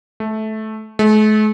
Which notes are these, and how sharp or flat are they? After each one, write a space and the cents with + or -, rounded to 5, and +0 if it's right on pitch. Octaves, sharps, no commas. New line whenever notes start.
A3 -15
A3 -45